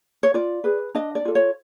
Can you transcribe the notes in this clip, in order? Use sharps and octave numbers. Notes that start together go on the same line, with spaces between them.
C#5
F4 D5
G#4 B4
D4 D#5
D5
F4 A4
C#5